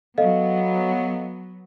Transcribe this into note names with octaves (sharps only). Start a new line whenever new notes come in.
F#3 B3 A4 D#5 F5